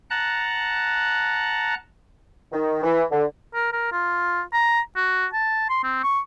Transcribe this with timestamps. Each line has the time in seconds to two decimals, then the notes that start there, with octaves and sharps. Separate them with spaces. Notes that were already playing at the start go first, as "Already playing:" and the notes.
0.10 F#5 A5 A#5 F#6
2.52 D#3
2.83 E3
3.11 D3
3.54 A#4
3.73 A#4
3.92 F4
4.53 A#5
4.96 F#4
5.33 A5
5.69 C6
5.84 C4
6.04 C#6